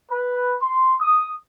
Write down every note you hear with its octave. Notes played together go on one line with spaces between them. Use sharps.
B4
C6
D#6